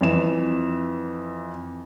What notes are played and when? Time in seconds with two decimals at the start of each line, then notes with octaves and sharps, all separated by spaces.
0.01 F2 E3 E7